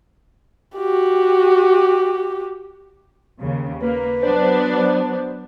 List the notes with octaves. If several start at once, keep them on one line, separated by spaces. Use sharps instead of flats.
F#4 G4
D#2 C#3
A#3 B4
F#3 B3 D4 C5